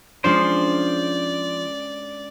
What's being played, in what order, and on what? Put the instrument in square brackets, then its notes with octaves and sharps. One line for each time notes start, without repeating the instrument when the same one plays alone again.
[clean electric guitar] F3 C5 [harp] G#3 C#4 D4 [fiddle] D5